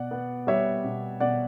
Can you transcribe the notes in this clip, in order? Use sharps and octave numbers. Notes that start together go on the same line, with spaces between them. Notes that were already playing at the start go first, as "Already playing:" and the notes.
Already playing: B2 D5 F#5
B3
G3 C#5 E5
B2
B2 D5 F#5